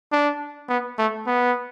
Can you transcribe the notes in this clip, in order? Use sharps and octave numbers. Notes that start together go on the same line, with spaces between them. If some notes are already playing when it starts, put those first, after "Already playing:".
D4
B3
A3
B3